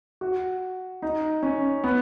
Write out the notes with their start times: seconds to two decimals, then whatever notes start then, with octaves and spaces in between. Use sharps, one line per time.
0.21 F#4
1.02 D#4
1.43 C#4
1.84 B3